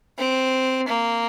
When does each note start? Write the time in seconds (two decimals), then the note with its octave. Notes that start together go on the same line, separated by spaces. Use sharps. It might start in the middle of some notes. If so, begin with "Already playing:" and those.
0.18 C4
0.88 A#3